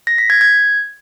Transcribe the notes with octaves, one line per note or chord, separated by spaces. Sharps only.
A#6
B6
G#6
G#6